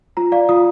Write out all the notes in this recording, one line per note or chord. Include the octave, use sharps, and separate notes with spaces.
F4 A#5
D5 F5
F4 D#6